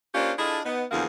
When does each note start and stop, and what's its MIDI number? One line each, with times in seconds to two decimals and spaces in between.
0.14 0.32 58
0.14 0.32 61
0.14 0.32 62
0.14 0.32 65
0.14 0.32 67
0.14 0.32 72
0.38 0.59 62
0.38 0.59 64
0.38 0.59 65
0.38 0.59 68
0.38 0.59 69
0.38 0.59 75
0.65 0.83 59
0.65 0.83 63
0.91 1.05 40
0.91 1.05 50
0.91 1.05 53
0.91 1.05 58
0.91 1.05 66
0.91 1.05 68